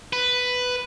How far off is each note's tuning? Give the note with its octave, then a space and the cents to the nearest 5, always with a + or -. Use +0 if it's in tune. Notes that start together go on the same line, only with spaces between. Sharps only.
B4 +5